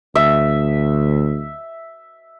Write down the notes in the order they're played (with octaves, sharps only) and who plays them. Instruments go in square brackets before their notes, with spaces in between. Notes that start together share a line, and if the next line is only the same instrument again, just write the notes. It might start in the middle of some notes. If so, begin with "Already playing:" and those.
[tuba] D2 [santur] E5